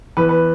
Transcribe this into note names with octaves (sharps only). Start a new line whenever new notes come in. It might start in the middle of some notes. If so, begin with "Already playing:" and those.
E2 B4
B4